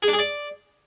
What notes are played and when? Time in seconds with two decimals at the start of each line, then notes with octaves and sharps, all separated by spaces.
0.03 G#4
0.08 D4
0.13 G#4
0.19 D5